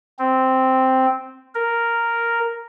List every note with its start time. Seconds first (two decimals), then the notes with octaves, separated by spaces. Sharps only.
0.19 C4
1.55 A#4